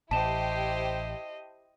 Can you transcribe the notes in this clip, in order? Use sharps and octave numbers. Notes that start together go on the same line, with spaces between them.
A1 E4 G4 C5 D#5 A5 E7